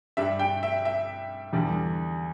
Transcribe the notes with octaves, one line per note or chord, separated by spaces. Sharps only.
G2 G3 E5
G5
E5
E5
E2 D3 G3